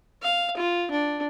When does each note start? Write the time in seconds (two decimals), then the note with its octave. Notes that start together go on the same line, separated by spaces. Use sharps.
0.22 F5
0.57 F4
0.91 D4